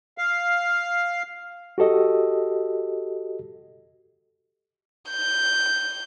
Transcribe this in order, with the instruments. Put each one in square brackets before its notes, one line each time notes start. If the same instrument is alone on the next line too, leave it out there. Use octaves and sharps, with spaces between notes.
[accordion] F5
[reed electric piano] F#4 G4 A4 D#5
[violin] G6